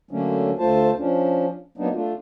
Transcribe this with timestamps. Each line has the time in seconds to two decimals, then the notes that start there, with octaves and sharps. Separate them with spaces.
0.11 D3 F#3 A3 A#3 C#4 D4
0.58 D2 A3 F4 C5 A5
0.98 F3 C#4 D4
1.78 F#3 A#3 B3 D4 D#4
1.93 A3 D4 F4